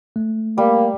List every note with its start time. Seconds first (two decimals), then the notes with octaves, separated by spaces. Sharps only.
0.16 A3
0.58 G3 A#3